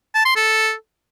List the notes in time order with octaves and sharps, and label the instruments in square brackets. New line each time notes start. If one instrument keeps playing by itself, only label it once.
[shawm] A5
C6
A4